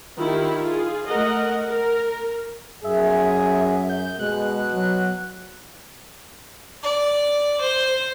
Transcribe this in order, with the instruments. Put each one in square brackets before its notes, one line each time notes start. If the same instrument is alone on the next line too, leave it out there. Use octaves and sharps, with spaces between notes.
[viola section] D#3 E4 F4 G4
F4 G#4
A3 A#4 D#5 F#5
A#4
[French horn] F#2 [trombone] G#4 [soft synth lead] E5
[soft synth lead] G6
[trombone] B2 [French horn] G#3 [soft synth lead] F#6
[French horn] F#3
[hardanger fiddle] D5
C5